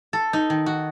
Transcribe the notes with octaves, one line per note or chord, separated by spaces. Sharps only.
A4
D#4
D#3
F#4